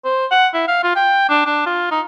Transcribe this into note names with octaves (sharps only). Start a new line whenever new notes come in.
C5
F#5
E4
F5
F4
G5
D4
D4
F4
D#4